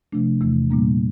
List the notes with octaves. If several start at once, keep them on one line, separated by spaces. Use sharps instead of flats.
C3 F3 A3 D4
E2 C3 E3 A3
A#2 G3 A#3 D4